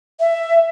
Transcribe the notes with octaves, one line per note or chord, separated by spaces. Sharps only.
E5